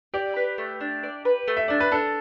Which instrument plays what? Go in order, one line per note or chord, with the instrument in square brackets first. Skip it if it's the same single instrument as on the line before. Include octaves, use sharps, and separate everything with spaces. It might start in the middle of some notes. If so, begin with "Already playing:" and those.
[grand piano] G4 [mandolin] D5
[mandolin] B4
A3
D4
D5
B4
A3
[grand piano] E5
[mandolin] D4 [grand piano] D5
[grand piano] B4
[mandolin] D4 [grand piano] A4